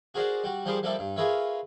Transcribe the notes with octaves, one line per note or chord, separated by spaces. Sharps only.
F#4 G#4 A#4 C5 D5 F#5
G3 F#4
F3 G3 G4 G#4 A#4 C5
F3 G3 A#3 G4 A4 E5
G2
F4 G#4 A#4 B4 C#5 E5